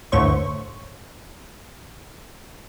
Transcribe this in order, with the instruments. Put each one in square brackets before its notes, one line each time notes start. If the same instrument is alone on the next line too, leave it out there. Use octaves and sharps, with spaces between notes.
[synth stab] G1 D2 A2 C5 C#5 C#6